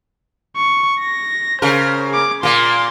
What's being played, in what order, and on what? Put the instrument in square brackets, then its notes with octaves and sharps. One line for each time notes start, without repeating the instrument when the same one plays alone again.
[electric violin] C#6
A#6
[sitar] C#3 A#4 [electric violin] C5
[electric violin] G#4 D6
[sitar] A#2 A#3 [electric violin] C6